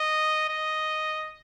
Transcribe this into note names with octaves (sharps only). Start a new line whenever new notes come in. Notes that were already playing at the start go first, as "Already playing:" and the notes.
Already playing: D#5
D#5